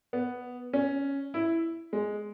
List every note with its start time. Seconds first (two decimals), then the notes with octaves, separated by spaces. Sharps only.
0.13 B3
0.73 C#4
1.34 E4
1.93 G#3